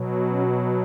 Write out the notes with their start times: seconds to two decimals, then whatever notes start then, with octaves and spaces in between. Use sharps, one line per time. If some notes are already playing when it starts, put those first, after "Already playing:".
Already playing: B2 F#3
0.29 C#4